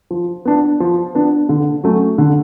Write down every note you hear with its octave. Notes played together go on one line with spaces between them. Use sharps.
F3
B3 D4
F3
B3 D4
D3
F#3 A3 C#4
D3